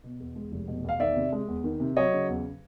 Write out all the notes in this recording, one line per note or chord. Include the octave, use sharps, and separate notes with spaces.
B2
E2
G#3
F1
B2
E2 F5
D#3 D5 E5
C3
G#3
E2
D#3
C3
F#3 C#5 D#5
C#3
E2